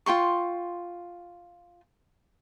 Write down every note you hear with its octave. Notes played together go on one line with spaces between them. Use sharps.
F4 G5 C6 C#6